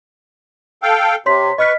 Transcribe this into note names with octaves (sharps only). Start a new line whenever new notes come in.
A4 F5 G5
C3 C#5 C6 B6
B4 D#5 C#6 F6 B6